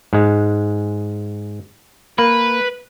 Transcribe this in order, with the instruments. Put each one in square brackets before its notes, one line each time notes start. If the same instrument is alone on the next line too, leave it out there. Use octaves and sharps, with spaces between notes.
[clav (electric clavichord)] G#2 G#3
[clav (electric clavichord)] A#3 [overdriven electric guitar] B4